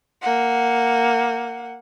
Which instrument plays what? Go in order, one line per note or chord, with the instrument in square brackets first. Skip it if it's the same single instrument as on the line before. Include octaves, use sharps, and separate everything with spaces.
[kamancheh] A#3 F#5